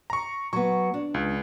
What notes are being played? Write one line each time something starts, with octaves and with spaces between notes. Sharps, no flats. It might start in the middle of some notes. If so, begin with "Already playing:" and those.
A#5 C#6
F#3 B3 C#6
D4
C#2